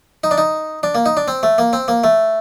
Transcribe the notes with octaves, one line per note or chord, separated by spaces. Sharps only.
D#4
D4
D#4
D4
A#3
D#4
D4
C4
A3
A#3
C4
A#3
A3